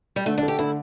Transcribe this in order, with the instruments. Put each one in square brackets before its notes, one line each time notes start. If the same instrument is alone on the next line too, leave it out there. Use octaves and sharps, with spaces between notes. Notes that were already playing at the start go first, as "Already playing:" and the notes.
[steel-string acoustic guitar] G3
[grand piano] D3 [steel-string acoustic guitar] A3
[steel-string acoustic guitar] D4
[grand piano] A3
[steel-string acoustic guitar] G4
[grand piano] D3 [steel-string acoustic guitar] E4